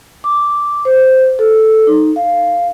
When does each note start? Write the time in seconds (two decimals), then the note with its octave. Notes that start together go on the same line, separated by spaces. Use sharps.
0.24 D6
0.85 C5
1.39 A4
1.87 D#4
2.16 F5